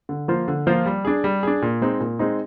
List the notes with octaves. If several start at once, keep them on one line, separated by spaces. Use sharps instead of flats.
D3
F3 A#3 F4 C5
D3
F3 A#3 F4 C5
G3
D4 G#4
G3
D4 G#4
A#2
G#3 C4 D#4
A#2
G#3 C4 D#4